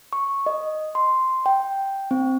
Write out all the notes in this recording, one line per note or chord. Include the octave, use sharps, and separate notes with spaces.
C#6
D#5
C6
G5
C4